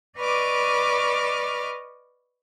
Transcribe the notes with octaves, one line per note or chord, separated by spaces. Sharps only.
B4 D5 D#5 C#6 D6 F6